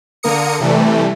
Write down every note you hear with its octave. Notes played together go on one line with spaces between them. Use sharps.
D3 A#3 A#4 D#6 C#7
C3 E3 G3 A3